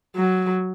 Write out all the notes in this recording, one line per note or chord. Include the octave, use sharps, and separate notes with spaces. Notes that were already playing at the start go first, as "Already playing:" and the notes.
F#3